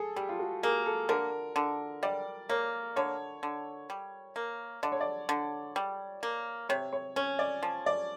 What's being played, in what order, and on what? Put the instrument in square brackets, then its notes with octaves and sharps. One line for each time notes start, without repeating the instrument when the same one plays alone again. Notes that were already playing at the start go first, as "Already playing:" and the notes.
Already playing: [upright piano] G#4 A4
[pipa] G3 [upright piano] G4
[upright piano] F4
F#4
[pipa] A#3 [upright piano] G#4
[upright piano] A4
[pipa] D3 [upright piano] A#4
[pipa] D3
[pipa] G3 [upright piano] D5
[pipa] A#3 [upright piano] C#5
[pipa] D3 [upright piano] C#5
[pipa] D3
G3
A#3
[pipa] D3 [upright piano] D5
[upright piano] C#5
D5
[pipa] D3
G3
A#3
[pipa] C3 [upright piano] C#5
[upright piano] C#5
[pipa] C#4 [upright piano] C#5
[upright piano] D5
[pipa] F3
[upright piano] D5